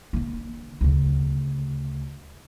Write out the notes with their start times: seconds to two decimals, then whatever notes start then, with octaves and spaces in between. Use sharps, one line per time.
0.13 D3 A#3
0.81 D2 C#3